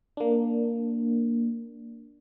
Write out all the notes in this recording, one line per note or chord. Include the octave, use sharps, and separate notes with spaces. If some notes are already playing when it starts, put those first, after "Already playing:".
A#3 D4